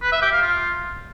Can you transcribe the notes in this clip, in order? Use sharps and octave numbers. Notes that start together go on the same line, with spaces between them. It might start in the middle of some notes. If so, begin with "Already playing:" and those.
B4
E5
G4
F5
F4